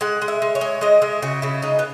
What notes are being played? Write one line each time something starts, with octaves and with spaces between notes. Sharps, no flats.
G#3 F#5
G#3
E5
G#3
C#5
G#3
G#3 D#5
G#3 E5
C#3 F#4
C#3 E4
G#3 D#4
B3